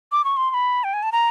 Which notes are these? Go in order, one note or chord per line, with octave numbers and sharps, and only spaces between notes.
D6
C#6
C6
C6
B5
G5
G#5
A5
A#5